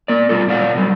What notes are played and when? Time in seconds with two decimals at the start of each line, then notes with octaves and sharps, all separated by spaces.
0.08 A#3 D5
0.29 B2 G3 F4 A4
0.47 A#2 D5 F5 F#5
0.75 B2 F#3 G3